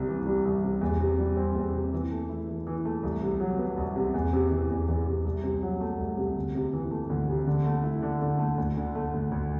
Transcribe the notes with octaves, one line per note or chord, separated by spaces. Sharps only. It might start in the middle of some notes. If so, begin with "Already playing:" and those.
Already playing: C2 C3
E3
G3
C2
C3
E2
C3
G3
C4
E2
C3
E3
A3
E4
E3
E3
A3
C2
C3
F#3
B3
C2
C3
E2
C3
E3
E2
E2
C3
C2
C3
F#3
A3
C2
C3
D2
C3
E3
A3
D2
C3
D3
A3
E4
D3
D3
A3
D2
D3
A3
D2
D2